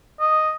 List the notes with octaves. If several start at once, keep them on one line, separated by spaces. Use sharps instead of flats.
D#5